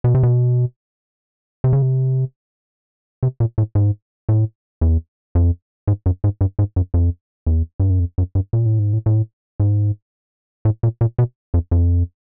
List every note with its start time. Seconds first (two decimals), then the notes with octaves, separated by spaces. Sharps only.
0.04 B2
0.15 C3
0.23 B2
1.64 C3
1.73 C#3
1.82 C3
3.23 C3
3.40 A#2
3.58 A2
3.75 G#2
4.29 A2
4.81 E2
5.35 F2
5.88 G#2
6.06 F#2
6.24 G#2
6.41 G2
6.59 G#2
6.76 F#2
6.94 F2
7.47 E2
7.80 G2
7.90 F#2
8.00 F2
8.18 F#2
8.35 G2
8.53 A#2
8.66 A2
8.79 G#2
8.93 A2
9.06 A2
9.60 G#2
10.65 A2
10.83 A#2
11.01 A#2
11.19 B2
11.54 F2
11.71 F2